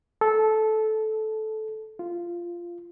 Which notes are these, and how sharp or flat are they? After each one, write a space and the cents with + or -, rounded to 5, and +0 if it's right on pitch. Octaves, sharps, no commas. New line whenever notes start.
A4 -15
F4 -10